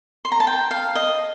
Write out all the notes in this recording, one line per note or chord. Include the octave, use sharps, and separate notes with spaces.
C6
A#5
A5
G5
F5
D#5